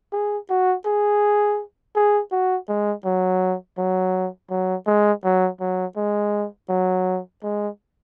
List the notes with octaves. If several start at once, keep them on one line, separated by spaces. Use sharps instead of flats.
G#4
F#4
G#4
G#4
F#4
G#3
F#3
F#3
F#3
G#3
F#3
F#3
G#3
F#3
G#3